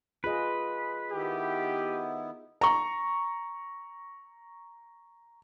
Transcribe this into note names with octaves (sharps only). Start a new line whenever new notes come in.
F4 G#4 B4 D#5
D#3 B3 E4 G4
A#5 C#6